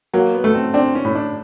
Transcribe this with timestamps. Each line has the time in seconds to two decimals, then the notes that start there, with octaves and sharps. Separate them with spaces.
0.14 F#3 A#3
0.34 B3
0.44 A3
0.55 C4
0.74 C4 D4
0.95 C#4
1.05 A2
1.15 D4